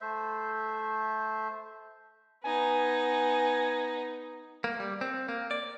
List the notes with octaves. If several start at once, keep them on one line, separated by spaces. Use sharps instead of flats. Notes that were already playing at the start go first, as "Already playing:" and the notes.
A3 C5 E5
B3 D#4 G#5
A#3
G3
C4
A#3
D5